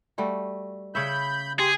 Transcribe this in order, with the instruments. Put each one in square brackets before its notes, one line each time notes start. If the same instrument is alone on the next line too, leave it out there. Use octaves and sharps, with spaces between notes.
[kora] G3 A3 F#4
[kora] C#3 C#5 E5 [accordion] B5 G6
[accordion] G4 C6 [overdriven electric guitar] G#4